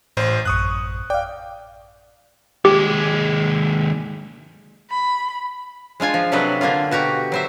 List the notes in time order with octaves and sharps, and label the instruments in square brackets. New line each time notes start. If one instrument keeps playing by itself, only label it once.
[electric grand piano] A1 C5 [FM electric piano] A2
[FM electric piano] A1 F#2 [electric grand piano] C#6 D#6 F#6
[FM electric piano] D5 F5 [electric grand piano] G5
[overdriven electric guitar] D#2 G#3 [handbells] G4
[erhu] B5
[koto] G#3 D4 F4 G#5
F3
C3 F#3 D4 A4 B4 D#5
D3 A#3 D4 F4
B2 F#4 G4 A#5
F#3 C5 E5